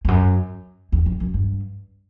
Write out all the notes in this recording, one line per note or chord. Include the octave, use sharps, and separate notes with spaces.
F2
F#2
E2
F2
F#2
G2